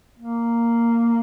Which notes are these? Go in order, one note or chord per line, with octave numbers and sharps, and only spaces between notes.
A#3